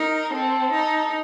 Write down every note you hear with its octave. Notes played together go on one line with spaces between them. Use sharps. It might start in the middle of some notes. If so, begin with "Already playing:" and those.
Already playing: D#4 A#4
C4 A4
D#4